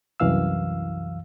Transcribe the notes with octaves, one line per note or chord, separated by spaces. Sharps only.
C2 F#2 E3 F5 E6